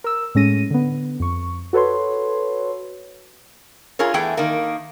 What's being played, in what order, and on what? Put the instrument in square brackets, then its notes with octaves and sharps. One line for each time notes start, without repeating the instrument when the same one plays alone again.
[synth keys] A#4 E6
A2 G#3 C#4 A#6 D#7
D3 B3
F2 C#6
F#4 A4 B4 C#5 C6
[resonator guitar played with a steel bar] F4 G#4 A#4 C#5
E2 A3 B3 G#4 G5
D#3 A#3